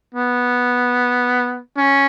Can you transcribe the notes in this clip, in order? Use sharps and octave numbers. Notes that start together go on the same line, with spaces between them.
B3
C#4